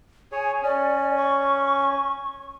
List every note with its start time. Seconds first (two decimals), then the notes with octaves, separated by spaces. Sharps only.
0.32 G#4 C#5 G#5
0.63 C#4 D5
1.17 C#6